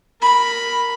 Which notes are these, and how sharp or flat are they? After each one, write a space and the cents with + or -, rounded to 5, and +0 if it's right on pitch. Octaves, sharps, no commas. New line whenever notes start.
A#4 +0 B5 +0